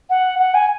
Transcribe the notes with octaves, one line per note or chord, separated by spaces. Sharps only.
F#5
F#5
G#5